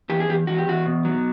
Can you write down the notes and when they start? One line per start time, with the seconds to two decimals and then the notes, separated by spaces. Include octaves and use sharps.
0.09 E2 G4
0.20 G#4
0.28 E2 G4
0.47 E2 F#4
0.58 G4
0.67 E2 F#4
0.86 B2
1.05 F#3